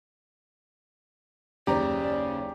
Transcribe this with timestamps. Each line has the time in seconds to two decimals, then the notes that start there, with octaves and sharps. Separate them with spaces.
1.67 F#1 D#2 C#3 G4 C5 D5 A#5